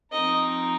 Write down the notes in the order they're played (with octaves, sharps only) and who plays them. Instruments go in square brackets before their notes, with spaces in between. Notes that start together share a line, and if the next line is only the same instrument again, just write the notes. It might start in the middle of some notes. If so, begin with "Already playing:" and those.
[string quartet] F3 C4 D#4 A#4 [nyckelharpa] D#5